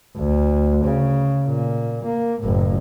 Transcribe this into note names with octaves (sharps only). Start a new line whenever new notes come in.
D2
C#3
A#2
A#3
F#1 A2